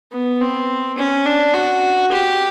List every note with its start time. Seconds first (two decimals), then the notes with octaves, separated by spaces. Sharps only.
0.12 B3
0.41 C4
0.97 C#4
1.26 D4
1.54 F#4
2.11 G4